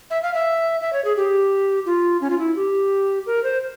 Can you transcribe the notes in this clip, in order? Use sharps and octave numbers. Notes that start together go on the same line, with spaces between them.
E5
F5
E5
E5
C#5
G#4
G4
F4
C#4
F4
E4
G4
A#4
C5